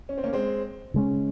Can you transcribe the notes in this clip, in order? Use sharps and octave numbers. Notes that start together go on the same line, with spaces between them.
C#4
C4
A#3 C#4
G#3 C4
C#3 G#3 C#4